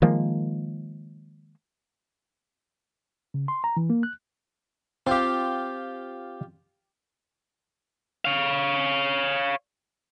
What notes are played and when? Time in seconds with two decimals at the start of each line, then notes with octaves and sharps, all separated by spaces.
0.02 D#3 F3 G#3 A#3
3.34 C#3
3.48 C6
3.64 A#5
3.77 E3
3.90 A#3
4.03 F#6
5.07 C4 F4 G4 C5 F5
8.25 C#5 F5